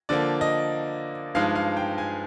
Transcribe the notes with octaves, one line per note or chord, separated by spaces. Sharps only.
D3 F3 A#3 D5
D#5
G2 F3 G#3 D#4 F5
F5
G5
G#5